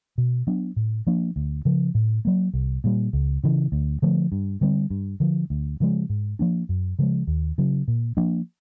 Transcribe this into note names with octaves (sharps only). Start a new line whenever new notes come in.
B2
F#3 B3 D4
A2
F3 A#3 D4
D2
C#3 F3
A2
F#3 A#3
C2
A#2 G3
C#2
C#3 E3
D2
D3 F3 A3
G2
D3 G3 C4
G2
D3 F3
D2
C#3 F3 G#3
G#2
F3 A#3 D4
F#2
C#3 F3 G#3
D#2
C#3 F#3
A#2
F3 A#3 D4